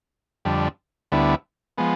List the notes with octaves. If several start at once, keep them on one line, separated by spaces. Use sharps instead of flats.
F2 D3 G3
D2 D3 G3 B3 E4
F3 G#3 B3